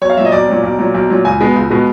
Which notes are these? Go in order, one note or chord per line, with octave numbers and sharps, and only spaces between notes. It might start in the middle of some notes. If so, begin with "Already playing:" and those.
B1 C#5
F5
A#2 F#3 E5
D#5
B1 D5
A#2 F#3
B1
A#2 F#3
B1
A#2 F#3
C#2 G#5
B2 G#3 B3
C#2
B2 G#3 B3